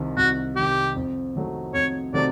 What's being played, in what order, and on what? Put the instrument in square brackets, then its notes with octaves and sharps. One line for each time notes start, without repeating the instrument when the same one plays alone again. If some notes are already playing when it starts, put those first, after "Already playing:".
Already playing: [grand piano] C2 C3 D#3
[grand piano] C2 [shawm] F#4
[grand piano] C3 D#3 [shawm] G4
[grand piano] F2
C3 D#3 F#3 A3
[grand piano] F2 [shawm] C#5
[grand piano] C3 D#3 F#3 A3 [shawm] D5